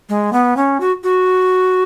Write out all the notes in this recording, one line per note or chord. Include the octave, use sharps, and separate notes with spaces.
G#3
B3
C#4
F#4
F#4